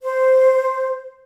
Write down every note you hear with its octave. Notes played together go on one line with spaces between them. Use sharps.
C5